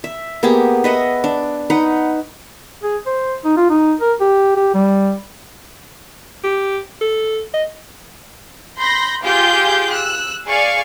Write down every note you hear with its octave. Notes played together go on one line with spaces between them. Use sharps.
E5
A#3 B3 G4 G#4
B4 D#5 E5 F#5
D4
D#4 B4 F#5
G#4
C5
D#4
F4
D#4
A#4
G4
G4
G3
G4
A4
D#5
B5 C6 G6 A#6
F4 G4 G#4 D6 G6
E6 F#6
G#4 D5 F5 G#5 C#6